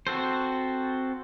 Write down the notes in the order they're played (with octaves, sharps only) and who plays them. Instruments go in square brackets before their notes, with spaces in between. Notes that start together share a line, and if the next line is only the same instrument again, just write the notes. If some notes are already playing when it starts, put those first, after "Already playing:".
[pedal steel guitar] C4 F#4 A4 C5